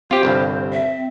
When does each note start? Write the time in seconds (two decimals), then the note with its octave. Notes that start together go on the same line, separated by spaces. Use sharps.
0.11 C4 F4 G4 C5
0.23 G1 C2 G2
0.73 E5